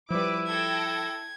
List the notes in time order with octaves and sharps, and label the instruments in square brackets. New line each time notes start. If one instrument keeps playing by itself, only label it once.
[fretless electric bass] F3 G3 [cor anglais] E4 [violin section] B4 D6
[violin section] A4 G5 A#6 [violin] G#6